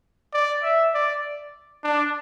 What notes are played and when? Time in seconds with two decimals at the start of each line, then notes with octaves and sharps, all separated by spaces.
0.33 D5
0.63 E5
0.94 D5
1.84 D4